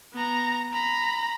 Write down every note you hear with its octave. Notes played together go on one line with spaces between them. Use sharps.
B3 A#5
A#5 B5